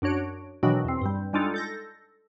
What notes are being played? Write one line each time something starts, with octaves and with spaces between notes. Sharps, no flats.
F#2 D4 F#4 C#5 D7
B2 D#3 E3 F#3 D4 F#4
E2 C4
G2 G3
G3 G#3 D4 D#4 F4 A4
A4 G6 A#6